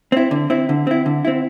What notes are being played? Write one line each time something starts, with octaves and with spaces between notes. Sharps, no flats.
C4 E4
D3
C4 E4
D3
C4 E4
D3
C4 E4